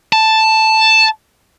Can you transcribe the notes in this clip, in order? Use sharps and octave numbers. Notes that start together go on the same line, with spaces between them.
A5